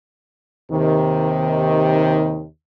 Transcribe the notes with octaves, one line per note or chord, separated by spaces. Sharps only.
D#2 C3 D#3